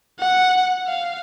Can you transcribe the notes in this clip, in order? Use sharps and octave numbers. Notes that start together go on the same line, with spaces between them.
F#5
F5